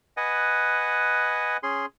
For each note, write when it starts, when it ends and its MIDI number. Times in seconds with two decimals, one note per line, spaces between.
0.17 1.57 71
0.17 1.57 75
0.17 1.57 78
0.17 1.57 80
1.63 1.86 61
1.63 1.86 68
1.63 1.86 84